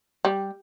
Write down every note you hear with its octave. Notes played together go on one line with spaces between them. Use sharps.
G3